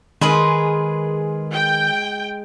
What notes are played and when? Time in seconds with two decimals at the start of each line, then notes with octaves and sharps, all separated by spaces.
0.21 D#3 G#3 G#4 A#4 B4
1.52 G5